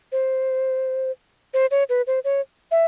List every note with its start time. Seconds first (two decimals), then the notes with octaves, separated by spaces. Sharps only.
0.12 C5
1.54 C5
1.71 C#5
1.89 B4
2.07 C5
2.24 C#5
2.71 E5